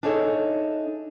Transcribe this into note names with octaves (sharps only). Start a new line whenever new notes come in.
D4 D#4 G#4 A4 C#5 E5